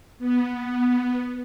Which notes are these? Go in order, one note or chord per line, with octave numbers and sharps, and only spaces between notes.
B3